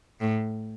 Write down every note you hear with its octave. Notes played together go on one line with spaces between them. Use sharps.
A2